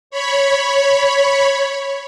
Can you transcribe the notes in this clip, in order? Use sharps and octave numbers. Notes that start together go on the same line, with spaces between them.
C#5 B5